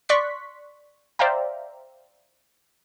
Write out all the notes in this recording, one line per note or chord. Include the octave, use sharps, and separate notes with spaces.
D5 C6 C#6 F#6 B6
C5 D5 E5 F5 G5 A#5